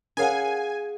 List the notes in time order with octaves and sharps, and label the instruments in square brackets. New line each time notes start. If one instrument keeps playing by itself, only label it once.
[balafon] C#4 A#4 C#5 [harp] G#4 F5 F#5 [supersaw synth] G#5